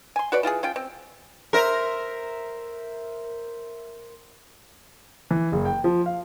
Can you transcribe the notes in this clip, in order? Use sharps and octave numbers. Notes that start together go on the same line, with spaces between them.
G#5 C6
F#4 B4 C#5 D5
E3 F4 G4 G#4
C#4 F4 G5
C4
A#4 C5 E5 A#5
E3
F#1
G5
F3
F5